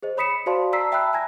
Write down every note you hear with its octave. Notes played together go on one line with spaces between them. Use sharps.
G#4 C5 D#5
C#5 B5 D#6 B6 C#7 E7
F#4 C5 D5 F5 A5 C6
D5 A5 A#5 E6 B6 C7
E5 G5 A5 B5 E6 F#6
G#5 A#5 G#6 A#6